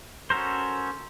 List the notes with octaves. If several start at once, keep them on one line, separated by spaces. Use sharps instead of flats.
C#4 F#4 A4 A#4 C5